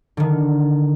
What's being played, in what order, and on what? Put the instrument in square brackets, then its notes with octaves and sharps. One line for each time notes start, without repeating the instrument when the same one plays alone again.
[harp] D3 D#3